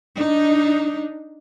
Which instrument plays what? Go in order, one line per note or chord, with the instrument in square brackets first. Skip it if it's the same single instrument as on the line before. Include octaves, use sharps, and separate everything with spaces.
[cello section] D4 D#4